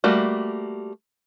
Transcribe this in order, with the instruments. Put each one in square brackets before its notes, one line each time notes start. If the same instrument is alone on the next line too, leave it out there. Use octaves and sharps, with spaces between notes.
[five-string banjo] G3 A3 A#3 F#4